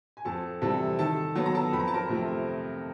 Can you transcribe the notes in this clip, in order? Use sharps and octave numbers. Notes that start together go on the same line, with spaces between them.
G#5
F2 A4 A5
C3 E3 G3 A4 A5
D#3 A4 A5
F#3 B3 A5
A#5
A4 A5
F2 B5
A#5
A5
A#4 A#5
C3 F3 A3 C4